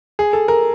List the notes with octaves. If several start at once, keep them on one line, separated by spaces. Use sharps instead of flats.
G#4
A4
A#4